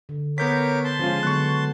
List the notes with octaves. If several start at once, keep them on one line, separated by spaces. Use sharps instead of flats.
D3
B3 A#4 C#5 D6 G6 B6
A5 C6
C#3 F3 G#3 C#4 F4
D3 F#3 B3 C#6 F#6